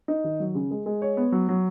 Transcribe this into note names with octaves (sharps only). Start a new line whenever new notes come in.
D#4
D#3
F#3
C#3
G#3
G#3
C#5
B3
F#3
F#3